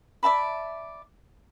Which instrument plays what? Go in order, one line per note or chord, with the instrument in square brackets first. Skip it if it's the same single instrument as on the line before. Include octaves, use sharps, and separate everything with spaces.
[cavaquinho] D5 E5 A5 B5